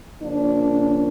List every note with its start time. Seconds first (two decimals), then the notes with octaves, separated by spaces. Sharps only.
0.22 C#3 F3 A#3 C#4 D4